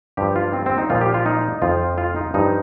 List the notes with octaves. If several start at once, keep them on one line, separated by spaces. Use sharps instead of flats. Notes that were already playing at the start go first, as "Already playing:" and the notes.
G2 F3 G4
F4
C4
C4
D#4
A#2 F3 F4
G4
F4
D#4
F2 F3 F4
F4
D#4
G2 F3 D#4